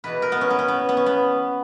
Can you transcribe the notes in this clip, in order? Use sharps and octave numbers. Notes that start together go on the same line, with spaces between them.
E2 B2 B4
A#4
B3
C#4
B3
C#4
B3
B3
C#4
B3